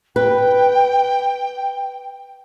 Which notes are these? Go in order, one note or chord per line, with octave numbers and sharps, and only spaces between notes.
B4 G5